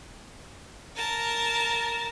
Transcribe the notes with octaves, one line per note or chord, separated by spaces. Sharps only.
A#4 A5